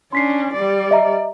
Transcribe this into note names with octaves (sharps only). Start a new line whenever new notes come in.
C#4 D4 C6 B6 C7
G3 D5
D#5 E5 A#5